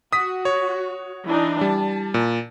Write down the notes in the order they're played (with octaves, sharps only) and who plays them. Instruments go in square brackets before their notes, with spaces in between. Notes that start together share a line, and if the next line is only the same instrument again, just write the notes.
[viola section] F#4 [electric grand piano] D#6 B6
[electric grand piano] C#5
[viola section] E3 D4 D#4
[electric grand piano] G3 [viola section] A5
[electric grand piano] A#2